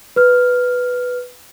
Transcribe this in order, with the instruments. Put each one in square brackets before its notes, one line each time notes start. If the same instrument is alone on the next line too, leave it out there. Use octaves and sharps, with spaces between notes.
[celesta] B4 F6